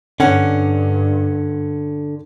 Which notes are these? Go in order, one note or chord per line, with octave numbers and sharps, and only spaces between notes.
G2 D3 C#4 F#5